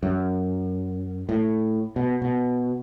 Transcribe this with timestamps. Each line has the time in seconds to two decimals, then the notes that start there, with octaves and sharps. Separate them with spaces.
0.03 F#2
1.29 A2
1.96 B2
2.22 B2